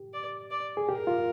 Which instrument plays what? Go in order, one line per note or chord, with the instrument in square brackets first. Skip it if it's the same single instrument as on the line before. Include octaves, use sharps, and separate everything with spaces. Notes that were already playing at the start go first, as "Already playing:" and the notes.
Already playing: [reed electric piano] G4
[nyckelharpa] D5
D5
[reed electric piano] G#4
[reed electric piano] G4 [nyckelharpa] A#4
[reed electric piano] F4